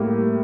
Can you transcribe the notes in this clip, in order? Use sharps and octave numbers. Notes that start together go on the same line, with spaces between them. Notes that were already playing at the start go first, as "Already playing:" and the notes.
Already playing: A2 G3 A#3